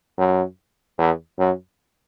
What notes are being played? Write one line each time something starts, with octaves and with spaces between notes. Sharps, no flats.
F#2
E2
F#2